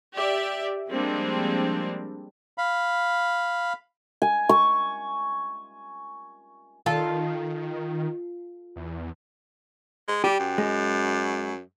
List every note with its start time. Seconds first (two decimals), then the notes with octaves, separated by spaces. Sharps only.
0.14 G4 D5 E5
0.89 F3 G3 G#3 A#3 C4 D4
2.58 F5 B5
4.22 G#5
4.49 C#6
6.86 D#3 F4 A4
8.76 E2
10.08 G#3
10.24 G3 G4
10.40 F#2
10.58 G#3